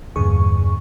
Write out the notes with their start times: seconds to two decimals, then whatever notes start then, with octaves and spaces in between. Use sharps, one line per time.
0.16 E2 G2 A#2 D3 G#4 C#6